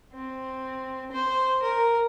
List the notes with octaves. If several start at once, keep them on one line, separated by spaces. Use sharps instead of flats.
C4
C5
A#4